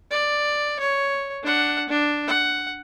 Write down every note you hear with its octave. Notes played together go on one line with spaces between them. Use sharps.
D5
C#5
D4 F#5
D4
F#5